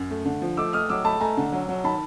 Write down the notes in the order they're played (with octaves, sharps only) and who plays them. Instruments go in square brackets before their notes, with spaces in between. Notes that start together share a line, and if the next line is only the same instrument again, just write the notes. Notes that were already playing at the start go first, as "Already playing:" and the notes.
Already playing: [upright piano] F#2
A3
D3
F3
[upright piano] A3 [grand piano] D6 E6
[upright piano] A3 [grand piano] D#6 F6
[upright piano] F#3 [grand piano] D6 E6
[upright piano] A3 [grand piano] A5 B5
[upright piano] A3 [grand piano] G#5 A#5
[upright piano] D3
F#3
F#3
[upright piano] D#3 [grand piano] A5 B5